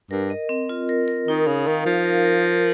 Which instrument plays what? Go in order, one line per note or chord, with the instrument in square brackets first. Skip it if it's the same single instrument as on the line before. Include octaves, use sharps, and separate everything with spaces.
[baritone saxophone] G2 [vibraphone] A#4
[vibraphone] D#5
C4
F4
A#4
A#4
[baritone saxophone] D#3 [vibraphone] D#4
[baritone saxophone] C#3 [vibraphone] F5
[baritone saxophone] D#3 [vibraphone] F5
[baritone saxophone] F3 [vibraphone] F5
[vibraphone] A#4
A#4
A#4